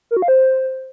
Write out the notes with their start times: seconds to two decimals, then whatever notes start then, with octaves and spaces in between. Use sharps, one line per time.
0.11 A#4
0.17 F#4
0.22 F5
0.28 C5